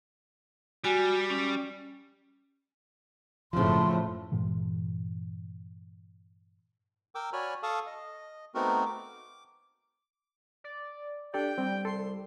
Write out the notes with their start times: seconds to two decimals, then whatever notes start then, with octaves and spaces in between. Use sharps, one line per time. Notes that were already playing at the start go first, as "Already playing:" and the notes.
0.84 G3 F#4 G#5
1.30 C#4
3.53 F#1 A2 F3 C4 C6
4.32 G2 A#2 E3 G#3
7.15 A#4 G5 D6 E6
7.33 F#4 C#5 D5 G#5 B5 F6
7.63 A4 F5 A5 C#6 D#6
7.87 D#5
8.54 A3 B3 C4 D#4 F#4 A#4
8.86 D6
10.64 D5
11.34 D4 G4 A4 D5 G5
11.58 G3 C4
11.85 C2 A4 C6